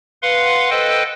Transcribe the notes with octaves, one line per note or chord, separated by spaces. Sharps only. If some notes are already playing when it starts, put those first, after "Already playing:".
B4 F5 F#5 C6
A4 B4 C5 D#5 G5